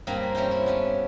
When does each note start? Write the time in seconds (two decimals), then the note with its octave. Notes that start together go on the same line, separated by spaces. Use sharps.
0.07 G2 A#3 C4 G#5 A#5 B5
0.35 C4 C#4 E4 G4
0.51 E4
0.66 B3 C#4 D4